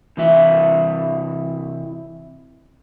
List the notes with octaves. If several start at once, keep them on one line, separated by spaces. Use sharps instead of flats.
C3 E3 E4 E5